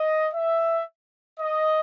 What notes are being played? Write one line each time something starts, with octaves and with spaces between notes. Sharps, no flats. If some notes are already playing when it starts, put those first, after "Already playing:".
Already playing: D#5
E5
D#5